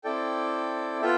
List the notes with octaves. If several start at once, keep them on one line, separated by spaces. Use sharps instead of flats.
C4 E4 A4 D5 G5
B3 F4 A4 E5 G5